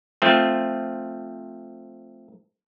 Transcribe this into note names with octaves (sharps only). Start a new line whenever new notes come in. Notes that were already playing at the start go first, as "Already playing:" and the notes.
F3 A3 C4